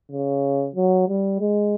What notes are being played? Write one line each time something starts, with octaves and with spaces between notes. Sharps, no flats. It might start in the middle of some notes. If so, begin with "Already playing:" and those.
C#3
F#3
G3
G#3